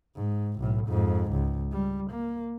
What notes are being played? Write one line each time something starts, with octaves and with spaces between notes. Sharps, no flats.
G#2
B1 A2
F2 G#2
C#2
G3
A#3